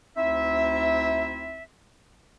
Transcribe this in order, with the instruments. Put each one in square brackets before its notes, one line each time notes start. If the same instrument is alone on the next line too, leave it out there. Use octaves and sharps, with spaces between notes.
[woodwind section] D2 C4 D#4 E4 E5